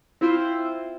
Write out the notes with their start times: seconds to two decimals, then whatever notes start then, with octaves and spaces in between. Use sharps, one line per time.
0.21 C4 E4 F4 C5